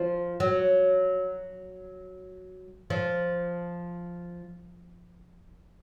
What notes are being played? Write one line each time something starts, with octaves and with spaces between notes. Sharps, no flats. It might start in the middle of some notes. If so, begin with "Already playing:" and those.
Already playing: F3
F#3
F3